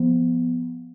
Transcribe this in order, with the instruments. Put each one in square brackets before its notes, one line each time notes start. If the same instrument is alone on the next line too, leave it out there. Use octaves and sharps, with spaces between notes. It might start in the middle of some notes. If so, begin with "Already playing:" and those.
Already playing: [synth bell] F3 B3